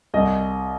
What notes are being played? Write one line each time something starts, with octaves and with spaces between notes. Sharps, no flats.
C2 D#5